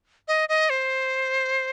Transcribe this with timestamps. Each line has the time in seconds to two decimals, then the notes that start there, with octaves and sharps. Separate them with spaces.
0.28 D#5
0.49 D#5
0.70 C5